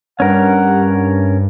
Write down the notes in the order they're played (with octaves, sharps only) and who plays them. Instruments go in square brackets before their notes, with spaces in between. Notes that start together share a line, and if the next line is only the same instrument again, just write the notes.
[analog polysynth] G2 [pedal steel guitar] C#4 A#4 [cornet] F#5